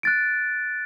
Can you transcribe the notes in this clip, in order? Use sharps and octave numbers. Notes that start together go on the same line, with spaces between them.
F#6 A6 D7